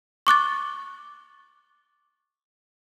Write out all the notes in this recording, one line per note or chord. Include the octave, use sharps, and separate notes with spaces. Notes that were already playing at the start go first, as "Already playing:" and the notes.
C#6 D6 F#6 A6